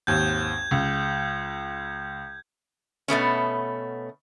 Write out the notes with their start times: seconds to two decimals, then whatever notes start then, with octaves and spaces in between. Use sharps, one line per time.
0.07 G#1 D#2 G6 G#6
0.71 C#2
3.08 B2 A3 B3 C#4